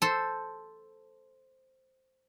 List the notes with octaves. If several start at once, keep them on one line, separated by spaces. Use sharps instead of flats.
A4 C5